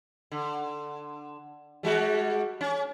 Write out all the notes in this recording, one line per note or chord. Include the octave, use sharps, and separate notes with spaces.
D3
G3 G#3 F#4
C#4